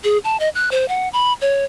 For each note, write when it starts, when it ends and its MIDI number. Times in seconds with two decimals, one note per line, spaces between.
0.04 0.18 68
0.24 0.37 81
0.40 0.49 75
0.55 0.69 90
0.71 0.88 72
0.88 1.09 78
1.13 1.33 83
1.41 1.65 73